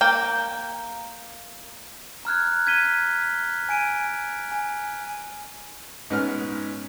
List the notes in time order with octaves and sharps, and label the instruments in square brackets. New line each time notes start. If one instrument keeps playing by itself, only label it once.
[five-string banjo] A#3 [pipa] G5
[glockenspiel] A#5 F6 F#6 G#6
G#6 B6 D#7 G7
G#5 G#6 D7 D#7
G#5
[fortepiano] G#2 B3 C#4 F6